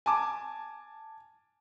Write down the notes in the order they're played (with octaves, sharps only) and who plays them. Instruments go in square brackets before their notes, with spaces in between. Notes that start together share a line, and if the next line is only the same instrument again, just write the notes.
[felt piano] G#5 A5 D6